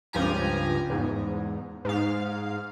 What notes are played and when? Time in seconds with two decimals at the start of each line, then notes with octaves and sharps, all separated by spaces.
0.13 C#2 G2 F3 G4 G#5 A#5
0.90 E2 G#2
1.85 G#2 F5